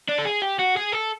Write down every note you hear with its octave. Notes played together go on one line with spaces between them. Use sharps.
D4
A4
G#4
G4
F#4
G#4
A4